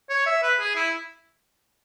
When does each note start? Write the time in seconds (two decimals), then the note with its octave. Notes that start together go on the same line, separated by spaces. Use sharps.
0.09 C#5
0.26 E5
0.43 B4
0.60 G#4
0.76 E4